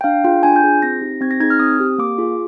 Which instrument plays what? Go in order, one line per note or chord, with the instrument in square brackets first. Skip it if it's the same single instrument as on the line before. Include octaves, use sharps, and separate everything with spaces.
[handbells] G5
D4 F5
F4 G#4 G5
D4 G#5
G6
F4 G#4
C4 A#6
D#4 G4
C4 G#6
A#6
D#4 G#4 G#6
F6
C4 D#6
G4
A#3 D6
F4 G#4